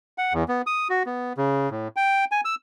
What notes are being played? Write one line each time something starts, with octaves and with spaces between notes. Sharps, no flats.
F#5
E2
B3
D#6
F#4
B3
C#3
A2
G5
G#5
E6